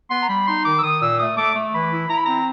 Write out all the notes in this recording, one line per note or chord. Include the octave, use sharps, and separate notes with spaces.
B3 C6
A#5
G3 B5
D#4 C6
D#3 D6
E6
D#3 D#6
A#2 E6
A3 D#6
A3 D6
A3
E3 B5
E4
E4 A#5
B5
C4 A#5